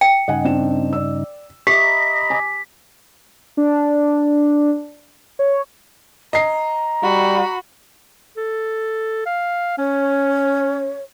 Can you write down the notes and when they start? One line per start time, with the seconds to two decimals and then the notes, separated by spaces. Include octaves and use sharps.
0.01 G5
0.28 G2 C#3 D#4 D#5 F#5 G#5
0.44 C4 D4 E7
0.93 D5 E6
1.67 G4 D#5 E5 A#5 B5 D6 B6
2.30 G#5 D6
3.57 D4
5.39 C#5
6.33 D#5 A#5 C7
7.03 G3 F#4 B5
8.37 A4
9.26 F5
9.78 C#4 C#5